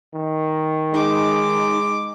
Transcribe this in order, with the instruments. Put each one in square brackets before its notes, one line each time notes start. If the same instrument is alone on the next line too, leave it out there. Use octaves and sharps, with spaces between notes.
[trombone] D#3
[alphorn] G#3 [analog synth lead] D#4 [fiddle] D6